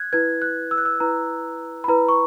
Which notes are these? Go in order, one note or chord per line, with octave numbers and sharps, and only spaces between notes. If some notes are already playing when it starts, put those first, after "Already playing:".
Already playing: F#6 G#6
E4 B4 G#6
F#6
E6
F#6
E6
E4 B4 A#5
B5
E4 B4 A#5
C#6